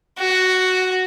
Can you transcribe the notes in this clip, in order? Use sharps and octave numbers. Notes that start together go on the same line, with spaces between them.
F#4